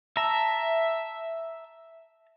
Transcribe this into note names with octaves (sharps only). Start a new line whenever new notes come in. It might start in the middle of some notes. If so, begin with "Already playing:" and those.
E5 A5 A#5